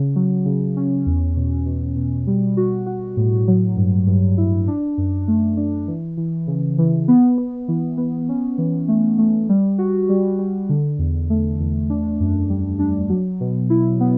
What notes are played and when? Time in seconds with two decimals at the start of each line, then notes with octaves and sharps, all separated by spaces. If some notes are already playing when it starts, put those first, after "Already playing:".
Already playing: C#3
0.16 F#3
0.45 C#3
0.77 C#4
1.06 E2
1.36 B2
1.66 B2
1.96 B2
2.27 G3
2.57 F#4
2.87 F#4
3.17 A2
3.47 F#3
3.76 G2
4.07 G2
4.38 E4
4.68 D4
4.98 F#2
5.28 A3
5.57 D4
5.87 E3
6.17 E3
6.47 C#3
6.78 E3
7.08 B3
7.38 B3
7.68 E3
7.98 B3
8.29 C#4
8.58 E3
8.88 A3
9.18 A3
9.49 G3
9.78 F#4
10.09 G3
10.39 G3
10.69 D3
10.99 E2
11.30 A3
11.60 E2
11.90 D4
12.20 F#2
12.50 G3
12.79 D4
13.09 F#3
13.40 B2
13.70 E4
14.00 B3